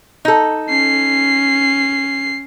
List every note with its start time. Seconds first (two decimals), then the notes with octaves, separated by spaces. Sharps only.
0.25 D#4 A4
0.69 C#4 C7